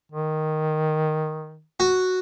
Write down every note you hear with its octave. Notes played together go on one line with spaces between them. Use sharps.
D#3
F#4